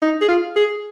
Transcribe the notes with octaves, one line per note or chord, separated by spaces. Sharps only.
D#4
G#4
F4
G#4